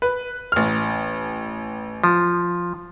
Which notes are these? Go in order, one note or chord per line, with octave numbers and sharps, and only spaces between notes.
B4
A1 F6
F3